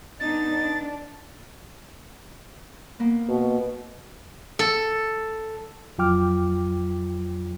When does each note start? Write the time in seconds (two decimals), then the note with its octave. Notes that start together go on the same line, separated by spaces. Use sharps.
0.20 B3 D4 D#4 A6
0.52 D4
2.99 A#3 B3
3.29 B2
4.59 A4
5.98 F2 F#3 F4 G5 D6 F6